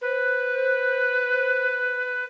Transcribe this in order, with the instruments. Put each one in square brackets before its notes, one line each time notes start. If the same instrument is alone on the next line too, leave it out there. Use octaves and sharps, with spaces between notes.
[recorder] B4 [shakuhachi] C5